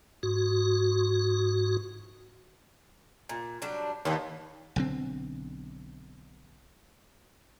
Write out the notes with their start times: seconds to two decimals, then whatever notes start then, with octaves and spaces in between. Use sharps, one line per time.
0.23 G#2 F#4
3.29 A#2
3.62 F#3 G3 D4
4.05 D#2 A#3 B3
4.76 B1 D3 C4